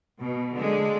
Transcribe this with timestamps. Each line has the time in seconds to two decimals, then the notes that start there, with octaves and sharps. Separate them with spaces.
0.22 B2
0.55 D3 G#3